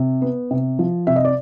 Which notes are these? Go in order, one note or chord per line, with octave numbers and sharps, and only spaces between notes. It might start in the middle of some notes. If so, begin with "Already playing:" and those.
Already playing: C3
B3
C3
F3
C3 E5
D#5
D5